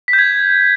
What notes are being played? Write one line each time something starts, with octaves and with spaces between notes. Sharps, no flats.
B6
G6
G#6